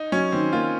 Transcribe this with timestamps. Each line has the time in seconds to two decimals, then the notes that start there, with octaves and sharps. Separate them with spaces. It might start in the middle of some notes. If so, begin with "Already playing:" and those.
Already playing: D#4
0.12 F#3 C#4
0.32 D#3 C4
0.53 A#3 F4